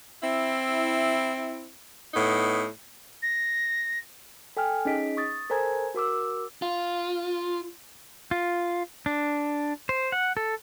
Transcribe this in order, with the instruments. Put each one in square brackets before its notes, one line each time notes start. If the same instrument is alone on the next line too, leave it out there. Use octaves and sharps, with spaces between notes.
[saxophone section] C4 E4
A2 B3 D#4
[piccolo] A#6
[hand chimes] A4 G5 G#5 F6
C#4 D#4 G#4 D#5 B6 D7
C#6 D#6 A6
A4 A#4 C5 G#5 A#5 G#6
F#4 A#4 D6 E6
[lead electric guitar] F4
[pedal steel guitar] F4
D4
C5
F#5
A4